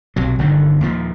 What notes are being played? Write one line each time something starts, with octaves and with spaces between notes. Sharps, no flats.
B1 C3 F#3
G1 D3 D#3
D#2 A#2 F3